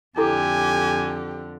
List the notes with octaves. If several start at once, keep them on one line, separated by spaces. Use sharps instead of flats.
F2 D3 E4 G4 A4 G#5 D6